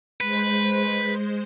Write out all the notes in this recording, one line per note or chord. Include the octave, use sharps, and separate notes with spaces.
G#3 B4 C5